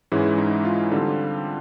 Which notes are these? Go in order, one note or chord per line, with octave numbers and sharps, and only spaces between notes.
G#2 E3 G#3 C#4 E4
D#4
F4
D3 G3 C4